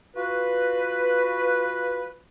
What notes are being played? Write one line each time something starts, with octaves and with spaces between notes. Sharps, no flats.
F4 F#4 B4